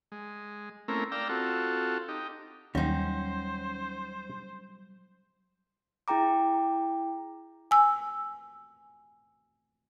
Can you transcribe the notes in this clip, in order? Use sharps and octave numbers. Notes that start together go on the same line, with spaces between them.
G#3
A3 A#3 C4 C#4 E4 A#4
D5 F5 G5 A#5 E6
C4 F4 F#4 A4
D#4 G4
D#2 F#3 G3 C#4 D#4 C5
E4 G#4 G5 A#5 D6
G#5 E6